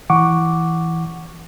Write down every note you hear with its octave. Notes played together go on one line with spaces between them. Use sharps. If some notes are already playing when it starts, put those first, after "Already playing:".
E3 F#5 C#6 D6